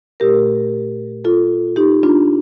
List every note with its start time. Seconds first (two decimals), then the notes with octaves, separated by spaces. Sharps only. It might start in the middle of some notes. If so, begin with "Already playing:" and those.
0.20 A#2 A3 G4 A#4
1.25 F4 A4
1.76 D#4 G4
2.03 D4 F4